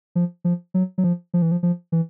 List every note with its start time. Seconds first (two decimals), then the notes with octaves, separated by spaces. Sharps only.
0.15 F3
0.44 F3
0.74 F#3
0.98 F#3
1.04 F3
1.34 F3
1.42 E3
1.52 F3
1.63 F3
1.92 E3